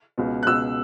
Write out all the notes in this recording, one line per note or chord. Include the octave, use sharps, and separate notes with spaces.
C#2 B2
F#6
C#2 B2 E6